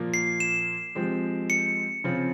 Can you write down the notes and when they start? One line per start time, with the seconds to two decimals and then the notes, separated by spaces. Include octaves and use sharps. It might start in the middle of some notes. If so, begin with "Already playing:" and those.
Already playing: A#2 F3 A#3
0.14 C7
0.40 E7
0.95 F3 G#3 C4 G4
1.50 C#7
2.04 C#3 F3 C4 F4